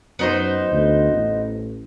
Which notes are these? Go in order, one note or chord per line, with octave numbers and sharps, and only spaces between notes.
F#2 B3 D#4 C5
D2
A1